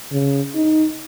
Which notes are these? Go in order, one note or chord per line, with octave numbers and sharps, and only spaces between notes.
C#3
D#4